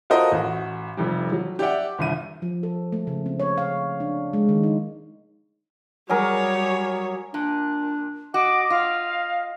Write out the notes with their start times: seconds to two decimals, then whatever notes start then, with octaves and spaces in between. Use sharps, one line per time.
0.10 F4 F#4 A4 A#4 C5 D#5
0.32 A1 F#4
0.97 F1 F2 G3
1.32 F#3
1.59 G4 D5 E5 F#5 G5
1.98 G1 C2 D#7
2.42 F3
2.63 A4
2.92 A3
3.07 C#3
3.26 C4
3.40 C#5
3.58 F5
4.00 D4
4.33 G#3
4.49 D#3
4.63 D#4
6.09 F#3 G3 G#4 A#4 C#5
7.34 A#2 D4
8.34 F#4 D#5 D6
8.70 F4 F5